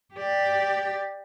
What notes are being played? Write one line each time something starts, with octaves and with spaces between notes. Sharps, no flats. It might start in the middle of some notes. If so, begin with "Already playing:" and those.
G4 D5